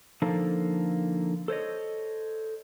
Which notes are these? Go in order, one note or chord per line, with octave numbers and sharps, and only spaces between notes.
D3 F3 A#3 D#4 A4
A4 C5 C#5 D#5